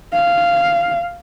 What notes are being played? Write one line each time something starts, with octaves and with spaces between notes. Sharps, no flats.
F5